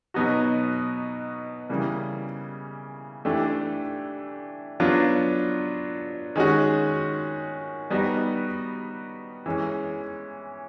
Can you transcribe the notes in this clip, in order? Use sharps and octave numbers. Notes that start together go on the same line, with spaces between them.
B2 F#3 B3 D#4 F#4
C#3 E3 G3 A#3
E3 A3 D4 G4
F#3 B3 D4 F4
D#3 G#3 C#4 F#4
G3 B3 D#4 F#4
E3 G#3 C#4 E4